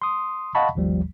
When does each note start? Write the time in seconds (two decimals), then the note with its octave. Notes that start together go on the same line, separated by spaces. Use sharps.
0.02 C6 D#6
0.55 D#5 F5 F#5 A5 B5 C#6
0.75 G#1 D#2 F3 G3